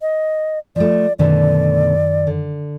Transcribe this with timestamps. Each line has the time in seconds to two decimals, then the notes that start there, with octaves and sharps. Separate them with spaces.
0.02 D#5
0.76 F3 A3 D5
1.19 F#2 B2 D3 D#3 A3 D5
2.27 D3